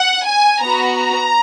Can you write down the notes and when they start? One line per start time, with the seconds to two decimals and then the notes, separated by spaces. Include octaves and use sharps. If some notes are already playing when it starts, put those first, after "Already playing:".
Already playing: F#5
0.25 G#5
0.62 B3 F#4 A#5
0.99 A#5